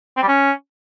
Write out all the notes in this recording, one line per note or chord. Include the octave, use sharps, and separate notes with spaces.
C4
G3
C#4